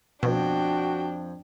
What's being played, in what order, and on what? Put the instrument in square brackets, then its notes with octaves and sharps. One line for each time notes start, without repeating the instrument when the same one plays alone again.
[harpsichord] F2 [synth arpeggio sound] B2 [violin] D4 G5 [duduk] F#4